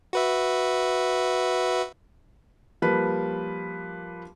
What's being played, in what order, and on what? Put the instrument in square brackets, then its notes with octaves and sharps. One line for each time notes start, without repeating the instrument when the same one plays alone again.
[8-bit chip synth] F#4 B4 E5
[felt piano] F3 G3 A#3 B4